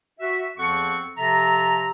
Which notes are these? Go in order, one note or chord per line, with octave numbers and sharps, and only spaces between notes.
F#4 E5
E2 F3 C4 A4 F#5 C#6
C3 F3 A4 E5 A#5